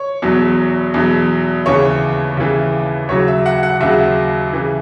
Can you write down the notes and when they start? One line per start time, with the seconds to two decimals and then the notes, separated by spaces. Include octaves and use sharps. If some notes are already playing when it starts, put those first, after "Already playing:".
Already playing: C#5
0.22 E2 B2 F#3
0.94 E2 B2 F#3
1.66 D#2 C#3 E3 C#5
2.37 D#2 C#3 E3
3.09 D#2 C#3 F#3 C#5
3.28 E5
3.46 F#5
3.63 F#5
3.81 D#2 C#3 F#3 E5
4.53 C#3 E3